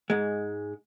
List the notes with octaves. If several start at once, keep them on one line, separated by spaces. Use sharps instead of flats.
G#2 G#3